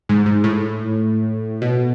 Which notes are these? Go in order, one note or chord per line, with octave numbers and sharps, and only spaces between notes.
G#2
G#2
A2
B2